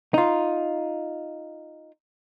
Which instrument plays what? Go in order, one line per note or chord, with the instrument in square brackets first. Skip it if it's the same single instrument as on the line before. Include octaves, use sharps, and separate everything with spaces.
[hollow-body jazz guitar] D#4 F4